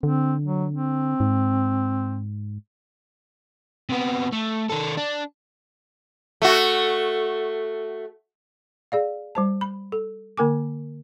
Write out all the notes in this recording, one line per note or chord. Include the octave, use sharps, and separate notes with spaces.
D3 C4
F#3
C4
G#2
C3 B3
A3
D#3 A4
D4
A3 F#4
G#4 D5 F5
G3 C5 A5
B5
A4
D3 A#3 A#4 G#5 D6